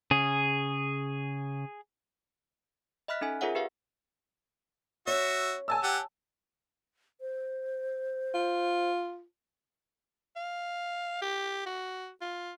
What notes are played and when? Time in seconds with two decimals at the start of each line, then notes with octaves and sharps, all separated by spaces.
0.11 C#3 G#4
3.08 D#5 E5 B5 F6 F#6 B6
3.21 C#4 D#4 A4 G#5
3.41 F4 G#4 A#4 C#5 E5 F#5
3.55 G4 B4 E5 F5
5.07 C#4 F#4 C#5 E5
5.68 G#5 A5 E6
5.84 G4 F#5
7.21 C5
8.34 F4
10.36 F5
11.22 G4
11.66 F#4
12.22 F4